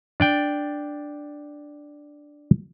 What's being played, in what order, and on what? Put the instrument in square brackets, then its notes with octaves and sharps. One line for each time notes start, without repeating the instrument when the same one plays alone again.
[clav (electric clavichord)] D4 D5 G5